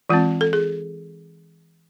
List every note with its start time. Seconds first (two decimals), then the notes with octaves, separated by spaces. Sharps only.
0.09 E3 G#3 C4 F4
0.41 A4
0.53 G#4